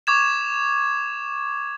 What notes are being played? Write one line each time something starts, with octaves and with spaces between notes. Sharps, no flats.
C#6 D6 G#6 E7